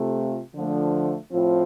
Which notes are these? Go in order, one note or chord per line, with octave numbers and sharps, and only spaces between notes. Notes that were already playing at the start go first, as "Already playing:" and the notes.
Already playing: C3 A3 F4
D3 F3 A3
A2 F3 C4 F4